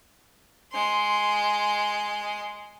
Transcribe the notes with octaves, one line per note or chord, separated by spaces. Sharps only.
G#3 C6